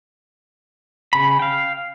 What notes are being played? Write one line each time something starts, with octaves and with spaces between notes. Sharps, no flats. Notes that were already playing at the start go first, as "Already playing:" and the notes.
C#3 B5
F5 G5